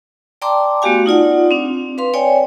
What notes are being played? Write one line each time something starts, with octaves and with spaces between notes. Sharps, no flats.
D5 G5 A5 A#5 C6 D6
A3 B3 F#4 G4 F5 G#5
D#4 F4 D5 F#5
C4 D4
B4 F5 C6
C#5 D5 G5 G#5